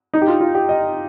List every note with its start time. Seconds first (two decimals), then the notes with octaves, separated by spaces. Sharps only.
0.14 D#4
0.22 G4
0.28 F4
0.41 F4
0.55 G4
0.69 D#5